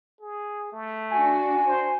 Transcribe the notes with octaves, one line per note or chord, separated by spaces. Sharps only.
G#4
A3
D4 F#4 G#5
C5